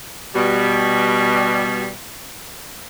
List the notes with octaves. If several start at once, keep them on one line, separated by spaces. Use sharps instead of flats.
B2 G3